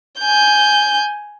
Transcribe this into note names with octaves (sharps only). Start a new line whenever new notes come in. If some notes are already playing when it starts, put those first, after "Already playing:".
G#5 G6